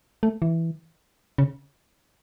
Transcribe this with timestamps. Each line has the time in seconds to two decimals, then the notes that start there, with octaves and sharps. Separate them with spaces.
0.23 A3
0.42 E3
1.38 C#3